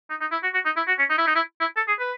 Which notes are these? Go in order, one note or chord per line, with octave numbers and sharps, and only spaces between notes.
D#4
D#4
E4
F#4
F#4
D#4
E4
F#4
C#4
D#4
E4
D#4
E4
E4
A4
G#4
B4